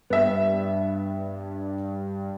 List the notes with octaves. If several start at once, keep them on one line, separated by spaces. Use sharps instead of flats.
G2 B3 E5